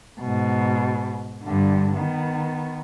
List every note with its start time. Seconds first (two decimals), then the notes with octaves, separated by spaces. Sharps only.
0.21 G#2 B2
1.43 G2 D3
1.96 D#3 B3